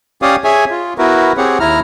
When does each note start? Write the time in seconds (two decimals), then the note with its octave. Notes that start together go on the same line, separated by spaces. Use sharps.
0.22 C#4 G4 C#5 D5 F5 D#6
0.44 G#4 C#5 E5 G#5
0.71 F4
0.98 B3 E4 F#4 A#4 B4
1.37 C4 G4 G#4 C#5 F#5
1.60 D#2 E4 A#5 F6